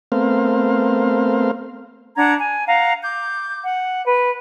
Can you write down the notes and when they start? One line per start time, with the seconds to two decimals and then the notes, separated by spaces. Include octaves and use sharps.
0.12 A3 B3 C4 A#4 C5 F5
2.16 D4 F#5 A#5 G#6
2.40 G#5
2.67 F5 F#5 A#5
3.03 D6 G6
3.62 F#5
4.05 B4